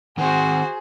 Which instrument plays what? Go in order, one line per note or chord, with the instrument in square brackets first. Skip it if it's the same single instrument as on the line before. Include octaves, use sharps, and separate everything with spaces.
[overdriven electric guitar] D#3 C4 [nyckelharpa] F#4 C5 [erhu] G#4 [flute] F#5